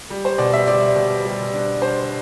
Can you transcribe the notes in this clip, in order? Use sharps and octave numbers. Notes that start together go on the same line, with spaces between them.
G3
C5
B2 D5
E5
G3 D5
B2
G3
D4
D4 C5